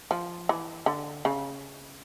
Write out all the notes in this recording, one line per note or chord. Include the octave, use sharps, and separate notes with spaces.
F3
E3
D3
C#3